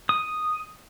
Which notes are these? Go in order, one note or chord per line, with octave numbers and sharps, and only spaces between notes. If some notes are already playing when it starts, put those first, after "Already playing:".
D#6